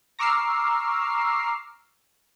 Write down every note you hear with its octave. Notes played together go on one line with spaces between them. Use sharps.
A#5 C#6 D6 E6 F6 C7